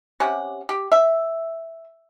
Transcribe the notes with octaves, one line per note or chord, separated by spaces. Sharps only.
C3 C#4 G4 F#5
G4
E5